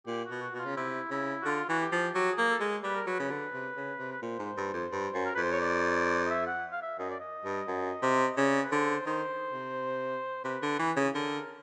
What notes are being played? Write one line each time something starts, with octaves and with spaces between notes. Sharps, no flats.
A#2 G4
F#4
B2
F#4
B2 F4 F#4
C#3
C3 E4
C#3 E4
F#4
D3 F4
E3 F#4
G4
F3
F#3 G4
G#4
A#3
A4
G#3
G3 B4
A#4
F#3 B4
C#3
D3
C3
C#3
C3
B4
A#2 C5
G#2
G2
F2
G2
F#2
A#4
F2 B4
C5
C#5
D5
D#5
E5
F#5
F5
E5
F#2 D#5
D5
D#5
G2
F#2
C3
C#3 D5
B4
D3 C5
D#3 C5
C3
C3 B4
D3
E3
C#3
D3 A#4